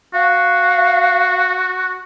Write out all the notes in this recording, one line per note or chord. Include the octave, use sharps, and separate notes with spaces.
F#4 F5